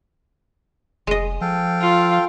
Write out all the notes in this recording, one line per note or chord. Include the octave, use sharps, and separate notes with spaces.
F1 G#3 D#5
F3 A4 F5 G5
F4